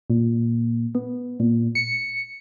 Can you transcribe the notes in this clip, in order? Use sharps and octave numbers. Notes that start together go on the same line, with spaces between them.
A#2
B3
A#2
C#7